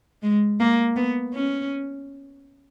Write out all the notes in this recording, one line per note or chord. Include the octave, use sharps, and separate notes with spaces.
G#3
A#3
B3
C#4